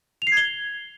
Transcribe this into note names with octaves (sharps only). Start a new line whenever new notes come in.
F7
C7
G#6
G7